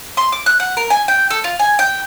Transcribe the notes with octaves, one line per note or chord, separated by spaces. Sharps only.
C6
D6
F#6
F#5
A#4
G#5
G5
A4
F4
G#5
G5